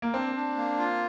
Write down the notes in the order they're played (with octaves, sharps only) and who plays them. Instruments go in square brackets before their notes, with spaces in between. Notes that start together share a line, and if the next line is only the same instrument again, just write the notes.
[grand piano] A#3
[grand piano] C4 [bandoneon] D4
[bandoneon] D4
A#3
F4